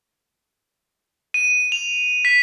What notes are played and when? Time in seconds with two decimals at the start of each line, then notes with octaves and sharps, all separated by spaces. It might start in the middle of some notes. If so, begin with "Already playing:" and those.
1.34 D#7
1.72 F7
2.25 B6